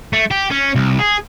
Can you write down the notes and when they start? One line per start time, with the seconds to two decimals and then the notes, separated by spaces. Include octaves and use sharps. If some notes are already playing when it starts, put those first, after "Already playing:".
0.13 A3
0.31 G4
0.50 C#4
0.75 C2
0.99 G#4